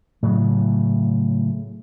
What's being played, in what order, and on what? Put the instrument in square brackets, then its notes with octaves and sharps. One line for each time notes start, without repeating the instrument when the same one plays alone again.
[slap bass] A2 C#3 F#3